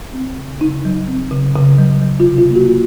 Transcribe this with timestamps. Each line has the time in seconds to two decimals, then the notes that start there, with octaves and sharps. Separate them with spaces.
0.13 C4
0.37 C#3
0.61 C#3 D#4
0.85 F#3
1.08 C4
1.31 C#3
1.56 C#3
1.78 F#3
2.02 F#3
2.20 F4
2.26 C3
2.38 F4
2.50 A#3
2.55 F#4